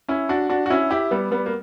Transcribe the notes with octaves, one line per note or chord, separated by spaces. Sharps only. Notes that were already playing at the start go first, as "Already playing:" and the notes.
C#4 E4
D4 F#4
D4 F#4
F#4
C#4 E4
E4 G4
G3 B3
G3 B3
A#3